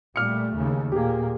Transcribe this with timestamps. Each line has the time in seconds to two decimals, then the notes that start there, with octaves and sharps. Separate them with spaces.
0.16 A#2 G3 A3 D6 F6 C#7
0.56 D#2 C#3
0.92 A#2 A#3 G4 G#4